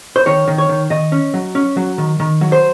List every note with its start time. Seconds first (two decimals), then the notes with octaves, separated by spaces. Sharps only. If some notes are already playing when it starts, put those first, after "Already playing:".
0.16 C5
0.26 D#3 C#5
0.48 D#3
0.58 C#5
0.69 D#3
0.90 D#3 D#5
1.12 C#4
1.34 F#3
1.55 C#4
1.77 F#3
1.98 D#3
2.20 D#3
2.41 F#3
2.52 C5